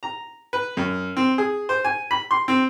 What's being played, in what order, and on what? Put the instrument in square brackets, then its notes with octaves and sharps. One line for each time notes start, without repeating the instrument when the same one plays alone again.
[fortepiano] A#5
B4
F#2
C4
G#4
C5
G#5
B5
C6
C4